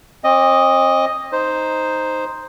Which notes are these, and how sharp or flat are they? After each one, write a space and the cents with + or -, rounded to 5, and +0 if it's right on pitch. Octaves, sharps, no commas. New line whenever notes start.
C4 +40 D#5 +0 D6 -20
D#4 +0 C5 +0